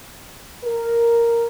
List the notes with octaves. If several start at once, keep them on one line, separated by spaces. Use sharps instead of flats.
A#4